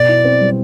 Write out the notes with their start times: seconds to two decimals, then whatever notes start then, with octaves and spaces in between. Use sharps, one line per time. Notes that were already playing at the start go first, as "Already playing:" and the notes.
Already playing: B2 D5
0.09 E4
0.24 C4
0.40 G3